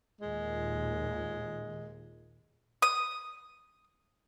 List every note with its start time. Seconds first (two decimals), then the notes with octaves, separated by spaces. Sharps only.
0.21 D#2 A#2 G#3
2.82 D#6